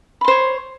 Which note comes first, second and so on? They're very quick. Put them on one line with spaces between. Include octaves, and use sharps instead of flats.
B5 C6 C5 C#5